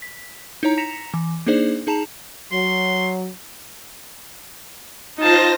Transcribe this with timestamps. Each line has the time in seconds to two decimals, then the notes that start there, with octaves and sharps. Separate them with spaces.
0.02 B6
0.63 D#4 E4 C#5 A#5
0.77 A#5 A#6 B6 C#7 E7 F7
1.14 E3
1.46 A#3 D4 D#4 G#4 C5 D5
1.87 D#4 G#4 A5 A#5 E7 F7
2.52 F#3 C6
5.18 D#4 F4 C5 A5 A#6